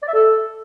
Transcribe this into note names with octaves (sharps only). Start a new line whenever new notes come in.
D5
E5
A4